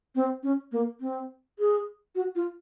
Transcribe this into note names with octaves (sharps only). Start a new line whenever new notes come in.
C4
C#4
A#3
C4
G#4
F#4
F4